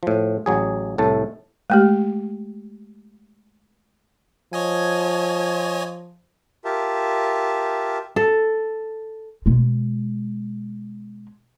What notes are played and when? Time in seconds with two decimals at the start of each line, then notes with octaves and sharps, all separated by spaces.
0.03 A2 F3
0.46 A1 F#3 G#4
0.98 C2 A2 A3 A5
1.70 G#3 A3 G4
4.53 F3 C#5 D#5 G#5
6.65 F4 G4 A#4 E5 A5
8.16 A4
9.46 B2 G#3